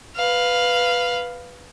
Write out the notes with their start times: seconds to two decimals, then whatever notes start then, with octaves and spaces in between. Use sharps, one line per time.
0.16 B4 F5